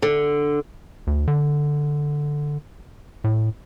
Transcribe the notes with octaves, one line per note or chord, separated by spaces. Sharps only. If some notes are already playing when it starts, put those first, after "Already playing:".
D3
D2
D3
A2